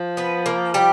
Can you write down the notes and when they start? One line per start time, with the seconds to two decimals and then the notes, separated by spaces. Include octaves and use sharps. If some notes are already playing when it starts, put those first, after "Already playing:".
Already playing: F3
0.17 B3 B4
0.46 A#3 A#4
0.74 G3 G4